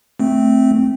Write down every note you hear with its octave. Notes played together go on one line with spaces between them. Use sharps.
A3 C4